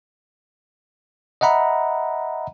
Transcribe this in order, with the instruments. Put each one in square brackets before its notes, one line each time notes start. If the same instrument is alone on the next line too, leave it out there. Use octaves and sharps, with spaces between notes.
[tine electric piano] D#5 E5 F#5 A#5 B5